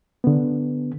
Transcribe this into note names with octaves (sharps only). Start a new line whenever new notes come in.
D3 B3